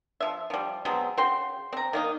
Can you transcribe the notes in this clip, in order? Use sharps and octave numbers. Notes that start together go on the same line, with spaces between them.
F3 E5
F3 G3
B2 F#3 G#3 C4
C#3 F#4 G5 C6
C4 A#5
D#3 A#3 D#4